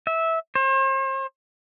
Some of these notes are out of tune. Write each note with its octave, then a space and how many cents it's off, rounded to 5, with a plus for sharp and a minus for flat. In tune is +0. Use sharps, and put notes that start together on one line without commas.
E5 -15
C5 +40